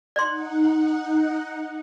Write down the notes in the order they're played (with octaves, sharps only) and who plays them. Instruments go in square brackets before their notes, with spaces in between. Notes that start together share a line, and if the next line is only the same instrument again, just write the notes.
[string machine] D#4 F#5 [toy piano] D5 C6